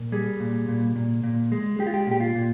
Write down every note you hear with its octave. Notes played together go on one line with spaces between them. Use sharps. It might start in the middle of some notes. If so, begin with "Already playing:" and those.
Already playing: A#2
G3 G#4
A#2
A#2
A#2
A#2
G#3
G#3 G4
F4
G4
A#2 G4
F4
A#2